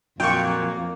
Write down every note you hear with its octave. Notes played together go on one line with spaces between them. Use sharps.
F2 A#2 F#3 A#3 G5 C#6